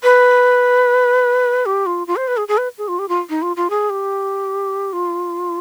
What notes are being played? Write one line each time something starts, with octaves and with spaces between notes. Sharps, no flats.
B4
G4
F4
F4
C5
B4
G#4
G#4
B4
G#4
F4
G4
F4
D#4
F4
F4
G#4
G4
F4